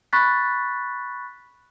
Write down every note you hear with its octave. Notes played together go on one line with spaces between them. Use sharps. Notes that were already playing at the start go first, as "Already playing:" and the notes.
B5 C#6 F#6 A6 B6